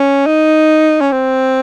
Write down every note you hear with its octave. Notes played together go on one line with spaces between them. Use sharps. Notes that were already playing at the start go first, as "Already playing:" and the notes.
Already playing: C#4
D#4
C#4
C4